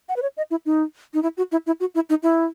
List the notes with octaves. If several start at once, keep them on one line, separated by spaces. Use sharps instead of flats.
F#5
B4
C#5
D#5
E4
D#4
D#4
E4
F#4
E4
E4
F#4
E4
D#4
E4